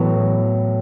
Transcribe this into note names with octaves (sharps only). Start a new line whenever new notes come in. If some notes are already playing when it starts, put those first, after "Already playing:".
Already playing: A2 E3 F#3 B3